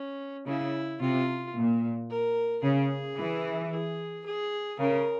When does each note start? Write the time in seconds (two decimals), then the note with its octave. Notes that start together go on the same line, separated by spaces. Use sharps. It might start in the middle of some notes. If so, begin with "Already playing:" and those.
Already playing: C#4
0.47 C#3 E4
1.01 C3 F4
1.56 A#2
2.10 A#4
2.63 C#3 G#4
3.17 E3
3.71 G#4
4.26 G#4
4.79 C#3 A#4